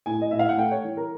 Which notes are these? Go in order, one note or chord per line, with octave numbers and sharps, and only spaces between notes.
A2 G#5
D#5
A2 E5
F5
F#5
A3 G5
C#5
E3
A#4